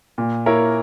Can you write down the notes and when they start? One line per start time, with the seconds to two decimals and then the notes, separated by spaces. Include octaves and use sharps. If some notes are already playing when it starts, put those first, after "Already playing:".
0.18 A#2
0.46 A#3 E4 A#4 C#5